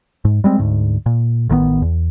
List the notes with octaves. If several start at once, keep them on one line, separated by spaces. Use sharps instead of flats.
G#2
G3 G#3 C4
D2 G#2
A#2
A1 D#3 A#3 B3
E2